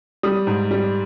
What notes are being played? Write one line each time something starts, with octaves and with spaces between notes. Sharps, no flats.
G3 D#6
G#2
G3